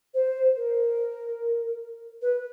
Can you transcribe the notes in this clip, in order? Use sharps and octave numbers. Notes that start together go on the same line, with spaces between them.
C5
A#4
B4